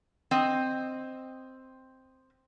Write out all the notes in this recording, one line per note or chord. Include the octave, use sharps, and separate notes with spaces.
C4 D#5